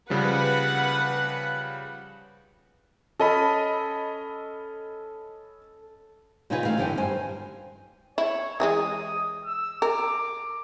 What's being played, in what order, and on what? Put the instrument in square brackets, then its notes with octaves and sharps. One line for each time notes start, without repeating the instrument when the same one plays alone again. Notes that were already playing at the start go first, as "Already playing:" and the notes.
[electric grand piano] C#3 F3 G3 [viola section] B4 F#5
[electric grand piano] C#4 D#5 B5 [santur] A4
[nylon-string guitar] A#2 C#3 D#4 F4 B4 G#5
D#3 A3 F5
F#2 D3 E3 D#4 G5 G#5
G2 C5 G#5
[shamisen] E4 [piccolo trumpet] C#5
[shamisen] E3 G3 G#3 [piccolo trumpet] D#6
[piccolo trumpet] E6
[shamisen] A#4 [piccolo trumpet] D6